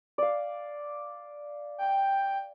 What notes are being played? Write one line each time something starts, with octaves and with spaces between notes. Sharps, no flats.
D5 F5
G5